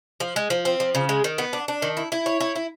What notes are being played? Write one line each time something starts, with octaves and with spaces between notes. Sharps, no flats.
F3
G#3
F3
C4
F3
C#3
G#3
D#3
B3
D4
D4
D#3
E4
E4
C#5
E4
E4